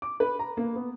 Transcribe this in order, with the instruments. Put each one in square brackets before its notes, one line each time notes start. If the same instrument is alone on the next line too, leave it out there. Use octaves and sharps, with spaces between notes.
[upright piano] D6
B4
A#5
A#3
B3